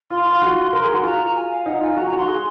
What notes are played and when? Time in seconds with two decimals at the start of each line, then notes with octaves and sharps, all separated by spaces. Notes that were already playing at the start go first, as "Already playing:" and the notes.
0.10 F4 C6
0.26 F4
0.42 F#4
0.73 A#4
0.84 G#4
0.94 F#4
1.03 F4 A#5
1.35 G#5
1.51 F5
1.66 D#4 F#5
1.81 F4 G#5
1.92 G#5
1.97 F#4 A#5
2.07 A#5
2.13 F#4 C6
2.28 G#4